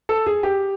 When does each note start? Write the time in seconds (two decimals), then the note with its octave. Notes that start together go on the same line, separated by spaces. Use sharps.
0.09 A4
0.26 G#4
0.43 G4